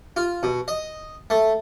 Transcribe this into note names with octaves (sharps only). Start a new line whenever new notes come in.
F4
B2
D#5
A3